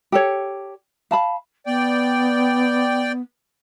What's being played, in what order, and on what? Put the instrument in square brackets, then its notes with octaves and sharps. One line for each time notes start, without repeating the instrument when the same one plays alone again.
[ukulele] G4 A4 C#5
F5 A5 B5
[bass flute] B3 [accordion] D5 G5